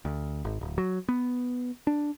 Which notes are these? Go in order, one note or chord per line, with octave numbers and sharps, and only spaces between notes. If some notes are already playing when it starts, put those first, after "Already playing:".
D2
G#1
D1
F#3
B3
D4